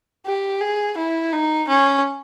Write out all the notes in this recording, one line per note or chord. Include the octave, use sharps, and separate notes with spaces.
G4
G#4
E4
D#4
C#4